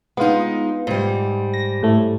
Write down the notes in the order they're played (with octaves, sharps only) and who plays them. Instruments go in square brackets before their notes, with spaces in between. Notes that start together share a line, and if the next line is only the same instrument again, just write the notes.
[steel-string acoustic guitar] G#3 D#4 [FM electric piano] B3 F4
[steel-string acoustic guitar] G#2 G3
[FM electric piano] A#6
A2 A3